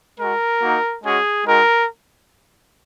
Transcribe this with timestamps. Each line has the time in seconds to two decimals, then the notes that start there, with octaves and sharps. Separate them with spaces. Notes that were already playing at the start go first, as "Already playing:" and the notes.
0.19 G#3 F#4 A#4
0.62 A#3 D#4 F#4
1.04 G#3 C#4 F#4 G#4
1.46 G#3 D#4 F#4 A#4